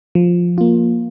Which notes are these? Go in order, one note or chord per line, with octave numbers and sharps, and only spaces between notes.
F3
A#3 F4